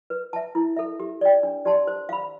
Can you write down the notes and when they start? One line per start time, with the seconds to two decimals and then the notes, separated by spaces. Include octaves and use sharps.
0.10 B4
0.33 E5 A5
0.55 E4
0.76 A4 E5
1.00 G4
1.21 D5 G5
1.43 D4
1.65 G4 D5 A5 C6
1.87 C5
2.09 F5 B5